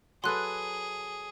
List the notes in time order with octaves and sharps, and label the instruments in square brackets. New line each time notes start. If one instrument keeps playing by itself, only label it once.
[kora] F#3 A4 B4 [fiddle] G#4 [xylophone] C6 F#6